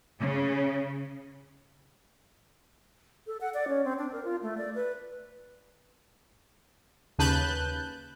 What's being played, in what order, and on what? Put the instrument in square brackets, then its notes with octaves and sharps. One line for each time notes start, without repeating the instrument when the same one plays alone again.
[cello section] C#3
[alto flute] A4
F#5
D5
C#4
C4
D4
A#4
F4
A3
D5
B4
[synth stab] D#2 C#3 B4 A5 F#6 G6